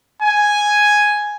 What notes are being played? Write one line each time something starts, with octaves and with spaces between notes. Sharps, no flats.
G#5